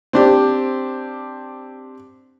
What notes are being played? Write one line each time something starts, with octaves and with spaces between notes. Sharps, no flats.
C4 D4 G4